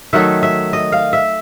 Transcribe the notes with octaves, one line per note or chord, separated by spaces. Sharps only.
D#3 F#3 A3 E5
E5
D#5
F5
E5